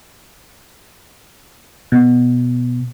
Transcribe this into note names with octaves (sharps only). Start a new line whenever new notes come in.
B2